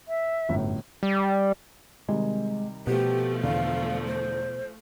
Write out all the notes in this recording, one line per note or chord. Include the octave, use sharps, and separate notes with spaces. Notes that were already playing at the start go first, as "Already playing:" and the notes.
E5
G1 F#2 A2
G3
C3 D#3 G3 G#3
B2 F3 A3 G4
E2 D3 F5
C5